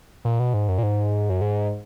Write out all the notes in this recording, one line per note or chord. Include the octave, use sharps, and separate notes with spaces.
A#2
B2
G#2
F#2
A#2
G#2
F#2
G#2